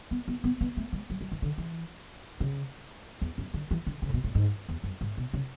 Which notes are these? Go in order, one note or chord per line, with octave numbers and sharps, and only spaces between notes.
B3
B3
B3
B3
A3
G#3
F#3
F#3
E3
D3
E3
C#3
E2
F#2
D3
E3
D3
C#3
A2
B2
A2
G#2
E2
F#2
G#2
B2
C#3